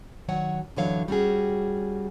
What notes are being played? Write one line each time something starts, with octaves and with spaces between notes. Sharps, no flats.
D#3 F#3 C#5 F#5 G#5
F#2 D3 E3 F#3 C#5 F5
G3 C#4 F#4 G#4